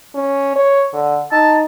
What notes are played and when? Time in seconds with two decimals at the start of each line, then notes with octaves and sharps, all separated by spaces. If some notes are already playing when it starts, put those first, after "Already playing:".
0.14 C#4
0.56 C#5
0.93 D3
1.32 D#4 A5